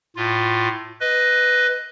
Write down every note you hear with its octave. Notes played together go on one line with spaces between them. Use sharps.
A2 F4
B4 D#5